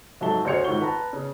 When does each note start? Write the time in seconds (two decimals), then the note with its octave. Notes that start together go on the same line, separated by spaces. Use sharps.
0.21 G#2 F#3 A4 E5 A5 G7
0.45 D2 C5 C#5 C#7 F7
0.64 G#2 D#3 F4 C#6 G7
0.81 B4 A5 A#5
1.13 C#3